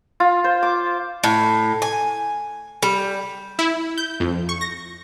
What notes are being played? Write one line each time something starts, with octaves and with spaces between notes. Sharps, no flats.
F4
C5
D6
A2
G#5
G3
E4
G6
F2
C#6
A#6